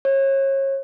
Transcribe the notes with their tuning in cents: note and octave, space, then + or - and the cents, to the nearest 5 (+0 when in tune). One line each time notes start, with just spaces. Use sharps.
C#5 -30